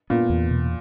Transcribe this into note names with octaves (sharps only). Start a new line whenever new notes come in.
A#2 B3
E2
B2